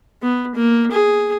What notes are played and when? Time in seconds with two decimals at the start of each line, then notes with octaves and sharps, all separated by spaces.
0.22 B3
0.55 A#3
0.91 G#4